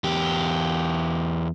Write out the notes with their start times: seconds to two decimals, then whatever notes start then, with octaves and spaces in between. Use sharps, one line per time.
0.04 E2 G4